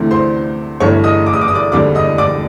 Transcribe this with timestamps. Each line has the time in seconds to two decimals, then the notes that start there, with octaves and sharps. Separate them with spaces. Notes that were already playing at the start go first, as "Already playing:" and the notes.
Already playing: D2 C3 E3 A3 C4
0.11 C5 C6
0.80 G1 G2 E3 A3 C#5 C#6
1.04 D#5 D#6
1.26 D6
1.33 D#6
1.41 D6
1.48 D#6
1.55 D5 D6
1.72 E1 D#2 D3 G3 C4 D5 D6
1.95 D#5 D#6
2.18 D5 D6